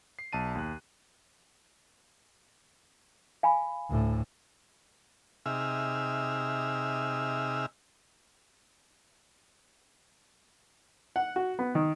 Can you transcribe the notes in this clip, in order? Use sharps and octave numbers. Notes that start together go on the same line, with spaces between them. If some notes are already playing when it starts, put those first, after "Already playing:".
C7
B1 A5 D#7
D#2 F#6
F5 G#5 B5
D2 A2
C3 D#4 G#4 E5 E6 F6
F#5
F#4
B3
D#3